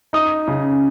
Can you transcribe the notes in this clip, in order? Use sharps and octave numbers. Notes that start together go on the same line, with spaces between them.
D#4 D#6
C#3